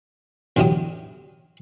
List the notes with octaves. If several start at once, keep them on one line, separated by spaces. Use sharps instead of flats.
E2 D3 F#3 E4 G4 D#6